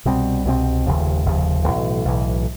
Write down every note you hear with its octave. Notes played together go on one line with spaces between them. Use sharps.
C2 B2 G3 C4
C2 B2 G3 C4
F1 D#2 C#3 F3
F1 D#2 C#3 F3
B1 A2 E3
B1 A2 E3